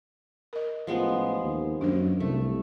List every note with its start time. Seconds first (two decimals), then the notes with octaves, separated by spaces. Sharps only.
0.53 A#4 D#5
0.87 A1 F3 G#3 B3
1.43 D#2
1.81 F#2 D4 C5
2.20 C2 A3